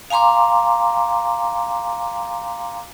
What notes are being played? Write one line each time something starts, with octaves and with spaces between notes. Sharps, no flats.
F5 G#5 A#5 C6 D6